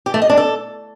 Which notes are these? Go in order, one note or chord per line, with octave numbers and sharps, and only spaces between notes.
G4
A3
D#5
D4
A4